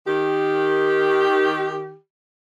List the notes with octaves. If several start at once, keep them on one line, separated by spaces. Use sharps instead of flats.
D#3 G4